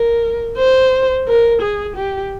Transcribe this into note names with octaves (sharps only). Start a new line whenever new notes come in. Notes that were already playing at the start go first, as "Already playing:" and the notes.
Already playing: A#4
C5
A#4
G#4
G4